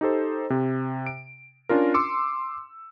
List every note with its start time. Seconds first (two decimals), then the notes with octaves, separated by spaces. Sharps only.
0.01 D#4 G4 A4 C5
0.50 C3
1.06 D7
1.69 C#4 D4 F4 A#4
1.94 C6 D6 E6 C#7